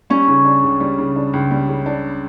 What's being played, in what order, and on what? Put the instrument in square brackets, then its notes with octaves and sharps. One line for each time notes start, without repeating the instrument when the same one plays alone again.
[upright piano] G3 [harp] C#4
[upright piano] C#3
D4
C#2
G3
C#3
D4
C#2
G3
C#3
D4